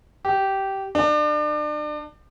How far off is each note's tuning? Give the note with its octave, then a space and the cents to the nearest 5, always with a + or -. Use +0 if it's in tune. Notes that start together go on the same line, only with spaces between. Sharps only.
G4 -15
D4 +35